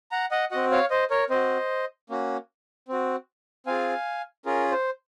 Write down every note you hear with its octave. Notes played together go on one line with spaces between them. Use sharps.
F#5 A#5
D#5 F#5
C4 F#4 D#5 F#5
C#5 F5
C5 D#5
A#4 C#5
C4 F#4 C5 D#5
A#3 C#4 F#4
C4 F#4
C4 F4 G#4 F5 G#5
C#4 F4 G#4 A#4
C5